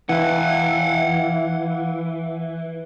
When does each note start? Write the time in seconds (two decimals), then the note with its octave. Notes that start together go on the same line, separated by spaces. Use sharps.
0.09 E3 F5 F#5